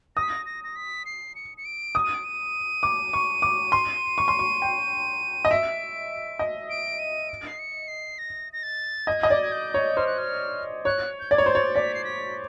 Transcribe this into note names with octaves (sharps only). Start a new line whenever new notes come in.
D#6 A#6
B6
A#6
A#6
A#6
B6
C7
C#7
C#7
D7
D#6
D#7
D7
D#7
D6
C#6
D6
C6
C#6
C6
C#6
G5
D#5
E5 D7
D#5
D7
D#7
D7
C7
C#7
C7
A#6
A#6
A6
D#5 G#6
D#5
D5
G#6
G6
C#5
C5 F6
F#6
F6
C#5 F#6
G6
D5 G#6
C#5
C5
C#5 A6
D5 B6
C7
B6